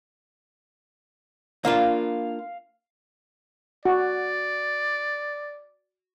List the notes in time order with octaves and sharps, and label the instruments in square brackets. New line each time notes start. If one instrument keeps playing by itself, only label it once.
[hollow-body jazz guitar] A#3 D4 F4 [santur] F5
[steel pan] F#4 [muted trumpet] D5